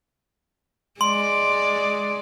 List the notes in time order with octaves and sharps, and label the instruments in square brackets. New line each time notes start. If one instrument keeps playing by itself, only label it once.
[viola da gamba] G#3 D5 [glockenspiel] C6